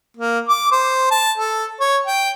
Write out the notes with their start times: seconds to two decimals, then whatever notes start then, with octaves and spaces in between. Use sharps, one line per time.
0.17 A#3
0.49 D6
0.72 C5
1.11 A5
1.38 A4
1.80 C#5
2.07 G5